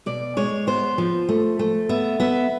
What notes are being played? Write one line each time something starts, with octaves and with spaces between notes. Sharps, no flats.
B2 D5
G#3 C#5
B3 C5
F3
A3
A3
B3 E5
B3 E5